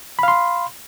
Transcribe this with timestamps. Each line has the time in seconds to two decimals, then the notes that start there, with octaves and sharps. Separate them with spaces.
0.19 B5
0.23 F5
0.28 C6